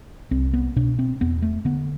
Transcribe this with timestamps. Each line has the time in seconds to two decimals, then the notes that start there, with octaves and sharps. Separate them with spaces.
0.31 C2 C4
0.53 B3
0.76 B2 D4
0.99 C4
1.21 E2 B3
1.42 A3
1.65 D3 B3